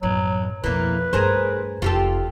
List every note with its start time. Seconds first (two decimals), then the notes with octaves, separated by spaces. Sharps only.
0.03 A1 F#2 F#3
0.64 F2 B2 E3 A#3 B4
1.13 G2 A3 G#4 A#4 C5
1.82 F1 F4 G4 A4